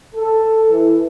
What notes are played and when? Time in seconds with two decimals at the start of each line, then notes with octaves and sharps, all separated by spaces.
0.15 A4
0.71 E3